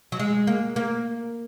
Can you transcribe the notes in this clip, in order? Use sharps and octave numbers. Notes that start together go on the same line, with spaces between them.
F#3
G#3
A#3
A#3